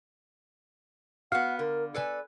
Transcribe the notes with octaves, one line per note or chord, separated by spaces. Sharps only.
B3 F#4 F5 F#5
D3 A#4
A4 B4 D5 G#5